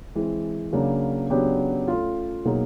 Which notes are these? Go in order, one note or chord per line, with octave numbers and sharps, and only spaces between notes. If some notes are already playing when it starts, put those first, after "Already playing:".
E3 G#3 C4
C#3 F#3 A#3 D4
C#3 F#3 B3 D4 G4
A3 C#4 F4
B2 F#3 A#3 D#4 G#4